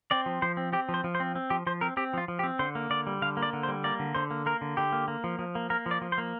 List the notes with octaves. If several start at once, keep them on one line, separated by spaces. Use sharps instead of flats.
C4 D5
F3
F3 C5
C4
C4 G4
F3
C5
F3
C5
C4
C4
F3 G4
F3 C5
C4 A#4
C4 G4
F3 F4
F3
G4
C4
D3 C5
A#3
D3 D5
G3
D3 F5
A#3
D5
D3
C5
G3
A#3 D5
D3
D3 C5
A#3
A#3 A#4
D3
D3 G4
A#3
A#3
F3
F3
A#3
A#3 A#4
F3
D5
F3
C5
A#3